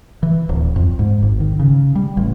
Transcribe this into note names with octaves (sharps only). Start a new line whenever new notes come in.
E3
D1
F2
G#2
G#1
D#3
C#3
G3
A1